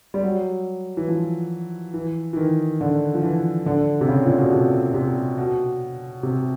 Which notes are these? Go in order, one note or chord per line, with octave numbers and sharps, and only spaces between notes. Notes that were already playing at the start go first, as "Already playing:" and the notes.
G3
F#3
E3
F3
E3
E3
D#3
D3
F3
E3
D3
C3
C#3
A#2
B2
C3
C3
B2
C3